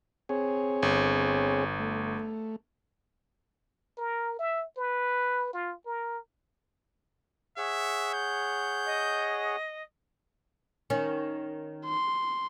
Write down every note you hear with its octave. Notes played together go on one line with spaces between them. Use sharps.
C4 G#4 C#5
G1
A3
A#4
E5
B4
F4
A#4
G#4 C#5 E5 F#5
G6
D#5
D#3 C#4
C6